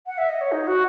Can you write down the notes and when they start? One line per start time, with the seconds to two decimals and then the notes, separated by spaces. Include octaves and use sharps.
0.06 F#5
0.18 E5
0.29 D#5
0.41 C#5
0.52 D#4
0.67 F#4